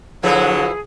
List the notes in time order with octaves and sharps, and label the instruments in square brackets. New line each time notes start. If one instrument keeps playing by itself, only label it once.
[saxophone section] D3 F#3 [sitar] F3 E4 B4 [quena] G#4